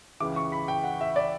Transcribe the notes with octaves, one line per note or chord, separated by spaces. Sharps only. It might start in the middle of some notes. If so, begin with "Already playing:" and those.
C#2 C#3 E3 D6
C#6
B5
G5
F#5
E5
D5